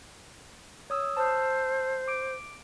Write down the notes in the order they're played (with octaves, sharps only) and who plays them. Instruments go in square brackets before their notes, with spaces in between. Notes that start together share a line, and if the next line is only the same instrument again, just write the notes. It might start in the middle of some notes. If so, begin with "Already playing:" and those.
[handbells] C#5 D#6 E6
[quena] C5 [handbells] A5 E6 F6
[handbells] D6 D7